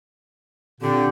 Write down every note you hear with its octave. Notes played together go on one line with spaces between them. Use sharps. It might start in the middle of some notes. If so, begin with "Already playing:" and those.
A#2 D3 C4 D4 G4